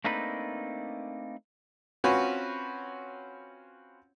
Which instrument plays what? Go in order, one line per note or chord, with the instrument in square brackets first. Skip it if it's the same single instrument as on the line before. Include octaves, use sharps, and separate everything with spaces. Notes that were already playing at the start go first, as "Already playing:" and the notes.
[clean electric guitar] A3 A#3 C4 D4 D#4 B4
[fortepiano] C4 C#4 F4 F#4 B4 C#5